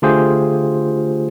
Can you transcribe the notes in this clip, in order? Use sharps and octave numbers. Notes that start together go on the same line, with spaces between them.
D3 A3 F4 G4 G#4 C5